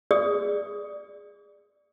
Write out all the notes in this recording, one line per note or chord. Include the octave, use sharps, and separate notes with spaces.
G#4 D5 D#6